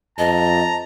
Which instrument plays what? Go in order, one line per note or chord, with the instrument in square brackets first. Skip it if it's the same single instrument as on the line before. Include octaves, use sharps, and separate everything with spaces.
[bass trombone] F2 [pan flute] D#5 [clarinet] A5 [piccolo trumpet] A#5